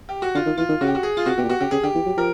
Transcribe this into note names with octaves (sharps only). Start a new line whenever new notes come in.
G4
F#4
D3 F4
D#3
E3 F4
D#3
C#3 F#4
G4
F#4
G#4
F4
C3 F#4
B2 G4
A#2
B2 F#4
C#3 G4
C#3 G#4
D3 G4
E3
F#3
F3 A#4